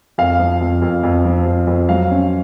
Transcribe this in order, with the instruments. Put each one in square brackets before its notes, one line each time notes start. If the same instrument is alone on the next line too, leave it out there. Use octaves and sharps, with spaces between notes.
[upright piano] F2 F5
F3
F2
F2
F2
F3
F2
F2
F#3 F5
C#4